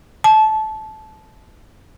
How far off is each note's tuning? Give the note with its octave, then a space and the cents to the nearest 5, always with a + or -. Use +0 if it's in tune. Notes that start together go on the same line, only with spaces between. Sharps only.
A5 -20